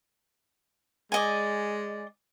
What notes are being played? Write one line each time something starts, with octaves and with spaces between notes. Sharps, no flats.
G#3 D5 D#5 G#5